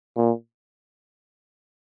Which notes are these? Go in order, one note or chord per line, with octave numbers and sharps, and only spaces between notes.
A#2